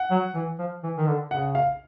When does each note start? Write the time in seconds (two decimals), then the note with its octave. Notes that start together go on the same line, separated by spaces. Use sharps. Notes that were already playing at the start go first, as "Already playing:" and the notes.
Already playing: F#5
0.11 F#3
0.35 E3
0.59 F3
0.83 E3
0.97 D#3
1.07 D3
1.31 C#3 F#5
1.55 F5